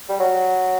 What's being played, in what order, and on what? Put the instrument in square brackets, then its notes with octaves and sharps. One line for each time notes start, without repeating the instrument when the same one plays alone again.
[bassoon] G3
F#3